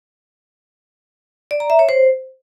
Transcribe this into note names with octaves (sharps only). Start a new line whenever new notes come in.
D5
A#5
E5
C#5
C5